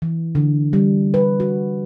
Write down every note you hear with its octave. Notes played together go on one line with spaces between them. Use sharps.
E3
D3
G3
B4
F#4